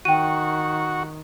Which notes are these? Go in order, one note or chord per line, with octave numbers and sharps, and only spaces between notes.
D#3 F#4 G5 D#7